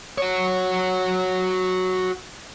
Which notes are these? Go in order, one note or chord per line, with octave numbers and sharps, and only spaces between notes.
F#4 C#5